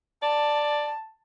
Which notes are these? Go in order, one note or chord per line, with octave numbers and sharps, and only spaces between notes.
D5 A5